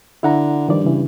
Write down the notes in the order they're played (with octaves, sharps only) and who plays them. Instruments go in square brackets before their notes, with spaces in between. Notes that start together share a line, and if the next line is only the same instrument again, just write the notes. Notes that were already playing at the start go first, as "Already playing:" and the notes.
[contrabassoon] D3 [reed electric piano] E4 F#5 A#5
[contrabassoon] G2 [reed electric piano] D#3 F3 D5
[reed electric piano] C#3 E3